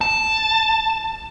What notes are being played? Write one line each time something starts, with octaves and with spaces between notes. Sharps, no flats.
A5